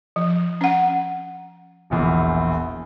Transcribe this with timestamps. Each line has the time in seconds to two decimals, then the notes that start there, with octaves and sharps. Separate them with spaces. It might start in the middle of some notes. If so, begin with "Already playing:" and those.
0.16 F3
0.61 C#4 F#5
1.90 E1 A#1 E2